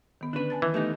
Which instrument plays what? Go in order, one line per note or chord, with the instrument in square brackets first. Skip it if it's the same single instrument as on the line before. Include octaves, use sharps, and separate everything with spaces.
[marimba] D#3 B3
[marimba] D3 C#4 [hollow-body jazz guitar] D4 B4
[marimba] G#5 A5 A6
[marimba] D#3 [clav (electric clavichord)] E3
[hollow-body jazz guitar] A3 B3 D#4 [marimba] G4 G#5